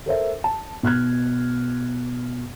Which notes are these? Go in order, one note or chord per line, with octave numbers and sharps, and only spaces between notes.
A4 A#4 C5 E5
A5
B2 F6 F#6 G#6